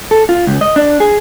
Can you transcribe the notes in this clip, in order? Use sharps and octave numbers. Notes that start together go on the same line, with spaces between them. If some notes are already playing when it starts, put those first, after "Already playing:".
A4
F4
C#2
D#5
D4
G#4